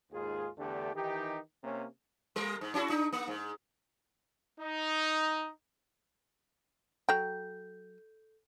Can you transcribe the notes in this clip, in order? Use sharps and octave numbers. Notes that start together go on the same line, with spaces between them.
D#2 G#2 F4 G#4
E2 D3 A3 D4 G4
D#3 E3 D#4 G4
C3 A#3 C#4
G3 A#4
G#2
C#4 E4 F#4
D4 D#4
A#3
G#2
D#4
F#3 A4 G5 G6